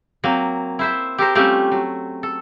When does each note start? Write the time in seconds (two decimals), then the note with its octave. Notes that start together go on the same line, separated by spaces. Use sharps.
0.24 F#3 A#3 C4
0.79 E4 C5 E5
1.18 G4 A4 A#4 C5
1.35 G3 A3 C4 C#4 F4 G4
1.71 F#3
2.23 A4